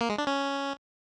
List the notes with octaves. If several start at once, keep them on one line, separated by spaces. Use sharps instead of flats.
A#3
G#3
D4
C#4